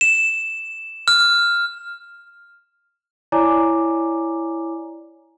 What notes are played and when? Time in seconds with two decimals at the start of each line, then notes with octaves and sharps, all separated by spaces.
0.01 E7
1.08 F6
3.32 E4 C#5 D5 G#5 A#5 D6